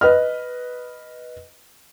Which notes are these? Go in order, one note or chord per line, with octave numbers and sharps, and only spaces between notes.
B4 D#5 F6